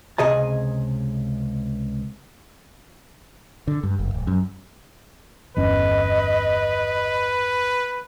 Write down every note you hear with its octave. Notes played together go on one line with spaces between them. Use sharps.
C#2 C3 G#4 D#5 A5
D3
G2
F#1
D1
F#2
G1 E2 C#4 B4 D#5